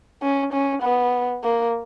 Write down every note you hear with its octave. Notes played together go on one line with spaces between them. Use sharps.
C#4
C#4
B3
A#3